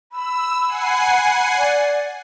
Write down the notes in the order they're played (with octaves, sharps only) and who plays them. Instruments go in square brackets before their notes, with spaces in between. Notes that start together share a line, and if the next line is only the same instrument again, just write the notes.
[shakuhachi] B5 [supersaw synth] E6
[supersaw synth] F#5 G#5 C7
[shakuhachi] D5